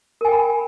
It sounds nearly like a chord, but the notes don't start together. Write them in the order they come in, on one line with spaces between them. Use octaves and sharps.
A#4 G#5 G5 B5